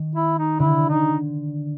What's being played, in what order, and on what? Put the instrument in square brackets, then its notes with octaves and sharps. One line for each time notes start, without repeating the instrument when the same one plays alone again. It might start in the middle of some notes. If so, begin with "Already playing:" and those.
Already playing: [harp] D#3
[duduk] E4
D#4
[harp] D3 [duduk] E4
[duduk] D#4